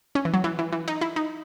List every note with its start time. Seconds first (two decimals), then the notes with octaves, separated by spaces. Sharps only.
0.15 C#4
0.25 E3
0.34 F#3
0.44 E3
0.59 E3
0.72 E3
0.88 D#4
1.01 E4
1.16 D#4